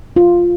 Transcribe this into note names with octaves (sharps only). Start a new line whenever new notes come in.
F4